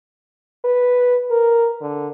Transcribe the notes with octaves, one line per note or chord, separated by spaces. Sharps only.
B4
A#4
D3